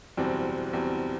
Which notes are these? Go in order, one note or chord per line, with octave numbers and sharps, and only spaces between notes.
F#1 E2 B2 G3 C4
F#1 E2 B2 G3 C4